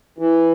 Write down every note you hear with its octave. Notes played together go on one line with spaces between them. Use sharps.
E3